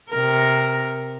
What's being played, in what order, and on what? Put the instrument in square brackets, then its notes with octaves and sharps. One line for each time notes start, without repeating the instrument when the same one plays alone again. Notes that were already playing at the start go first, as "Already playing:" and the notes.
[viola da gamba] C3 A#4